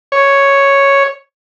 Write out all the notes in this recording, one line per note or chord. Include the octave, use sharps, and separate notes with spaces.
C#5